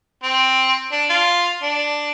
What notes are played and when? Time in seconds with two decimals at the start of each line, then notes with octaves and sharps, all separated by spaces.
0.23 C4
0.92 D4
1.10 F4
1.63 D4